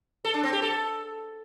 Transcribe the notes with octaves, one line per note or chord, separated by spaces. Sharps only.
A4
D4
C4
G4
A4